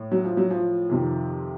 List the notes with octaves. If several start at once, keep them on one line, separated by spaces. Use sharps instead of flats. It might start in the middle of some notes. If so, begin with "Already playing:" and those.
Already playing: A2
F#3
F3
F#3
F3
F2 C3 D#3